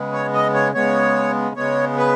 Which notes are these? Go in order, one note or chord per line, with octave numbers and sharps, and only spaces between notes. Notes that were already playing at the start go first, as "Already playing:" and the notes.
Already playing: C#3 G#3 B3
C#5
D#5
C#5
C#3 G#3 B3 C#5
C#3 G#3 B3 C#5
B4